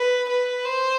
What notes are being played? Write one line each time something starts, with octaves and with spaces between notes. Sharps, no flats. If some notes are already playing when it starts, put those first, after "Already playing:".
Already playing: B4
B4
C5